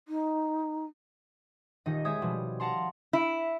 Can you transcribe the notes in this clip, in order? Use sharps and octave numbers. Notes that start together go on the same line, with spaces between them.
D#4
D#1 A#2 D#3 D#4 D#5
G#3 C#5 E5 D#6 G6 G#6
B2 F3 G3
F5 F#5 A5 A#5 C6
E4